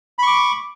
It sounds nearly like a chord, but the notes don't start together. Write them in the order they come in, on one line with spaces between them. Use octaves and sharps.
B5 C#6 D6